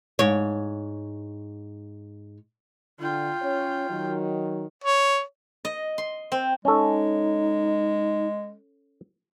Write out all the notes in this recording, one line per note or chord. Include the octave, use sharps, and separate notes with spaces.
G#2 C#5
D3 F4 G5
C#4 C#5
D#3 F#3
C#5
D#5
C6
C4
G#3 C#4 D#4 A4